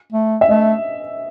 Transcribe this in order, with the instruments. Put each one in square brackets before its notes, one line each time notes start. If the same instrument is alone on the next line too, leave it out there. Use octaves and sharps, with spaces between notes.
[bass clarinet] A3
[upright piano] E5
[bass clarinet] A3 [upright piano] D#5